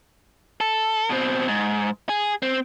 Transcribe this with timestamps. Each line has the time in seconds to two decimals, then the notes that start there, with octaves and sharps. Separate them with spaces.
0.61 A4
1.10 B2 C4
1.48 G#2
2.09 G#4
2.43 C4